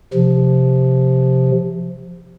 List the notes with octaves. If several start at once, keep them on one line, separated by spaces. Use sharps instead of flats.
C3 F3